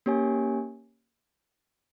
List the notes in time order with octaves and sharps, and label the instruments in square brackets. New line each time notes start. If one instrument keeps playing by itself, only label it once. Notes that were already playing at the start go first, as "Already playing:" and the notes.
[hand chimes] A#3 C#4 G4 C#5 G#5